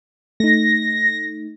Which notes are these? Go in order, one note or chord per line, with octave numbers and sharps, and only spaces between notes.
A3 D#4 A#6